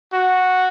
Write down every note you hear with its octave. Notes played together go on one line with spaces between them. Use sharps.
F#4